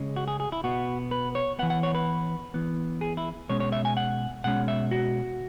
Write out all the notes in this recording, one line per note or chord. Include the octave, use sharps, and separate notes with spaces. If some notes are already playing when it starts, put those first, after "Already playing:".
Already playing: C#3 G#3 C#4
F#4
G#4
G#4
E4
B2 B3 F#4
B4
C#5
E3 B3 F#5
F#5
C#5
B4
E3 B3
G#4
E4
B2 G#3 C#4 C#5
C#5
E5
G#5
F#5
B2 G#3 C#4 F#5
E5
F#4